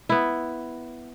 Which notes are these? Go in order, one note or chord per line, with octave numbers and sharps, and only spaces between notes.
B3 E4